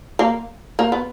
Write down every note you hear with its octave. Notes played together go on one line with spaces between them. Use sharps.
A#3
A#3
B3